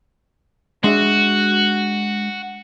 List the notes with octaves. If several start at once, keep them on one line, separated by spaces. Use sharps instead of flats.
G#3 D4 F#4 E5